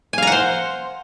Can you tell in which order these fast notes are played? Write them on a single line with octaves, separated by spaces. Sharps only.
G#5 F5 A#5 F#5 C5